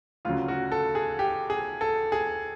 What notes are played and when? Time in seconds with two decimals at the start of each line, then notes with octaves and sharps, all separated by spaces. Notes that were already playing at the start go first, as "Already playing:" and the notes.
0.25 D2 C#3 F#3 F4
0.48 F#4
0.72 A4
0.95 G#4
1.19 G4
1.50 G#4
1.81 A4
2.12 G#4